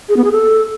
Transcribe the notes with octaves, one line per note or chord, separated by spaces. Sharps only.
G#4
B3
G#4
A4